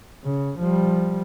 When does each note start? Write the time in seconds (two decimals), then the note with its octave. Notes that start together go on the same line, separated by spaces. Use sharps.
0.25 C#3
0.59 F3 G3